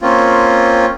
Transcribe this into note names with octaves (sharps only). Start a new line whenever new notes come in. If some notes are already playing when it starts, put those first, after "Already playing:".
A#3 C4 C#4 F4